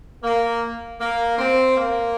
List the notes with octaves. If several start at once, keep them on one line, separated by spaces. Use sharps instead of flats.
A#3
A#3
C4
A#3